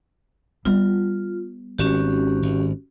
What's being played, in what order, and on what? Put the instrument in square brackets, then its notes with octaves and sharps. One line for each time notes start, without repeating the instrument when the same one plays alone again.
[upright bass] G3 B3 [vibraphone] F4
[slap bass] G#1 [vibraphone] C#4 F#4 G4
[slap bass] G#1